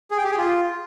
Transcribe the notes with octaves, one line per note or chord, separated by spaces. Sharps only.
G#4
G5
G4
G#4
F4